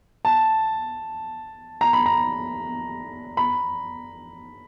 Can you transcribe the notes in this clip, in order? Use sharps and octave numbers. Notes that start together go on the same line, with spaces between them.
A5
A#5
B5
A#5
B5